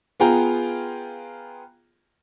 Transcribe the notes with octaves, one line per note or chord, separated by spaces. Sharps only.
B3 F4 G#4 G5 A#5